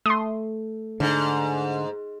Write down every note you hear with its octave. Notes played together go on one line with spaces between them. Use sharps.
A3 C6 D#6
G#2 D3